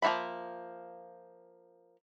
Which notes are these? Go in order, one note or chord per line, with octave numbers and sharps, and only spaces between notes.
F3 A#3 E4 E5 B5